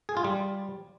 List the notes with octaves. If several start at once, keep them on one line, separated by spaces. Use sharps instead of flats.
G#4
F4
G3